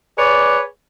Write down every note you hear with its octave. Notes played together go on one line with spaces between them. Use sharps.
G#4 B4 C#5 D5